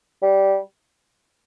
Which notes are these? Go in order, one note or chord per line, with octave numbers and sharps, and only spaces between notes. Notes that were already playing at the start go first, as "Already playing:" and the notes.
G3